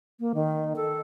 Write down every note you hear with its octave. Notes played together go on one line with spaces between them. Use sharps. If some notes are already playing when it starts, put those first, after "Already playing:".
A#3
D#3
A4